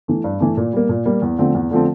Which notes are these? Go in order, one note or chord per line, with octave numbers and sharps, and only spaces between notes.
E3 A3
G2
E3 A3
A#2
G3 A#3
A#2
G3 A#3
E2
D3 F3 A3 C4
E2
D3 F3 A3 C4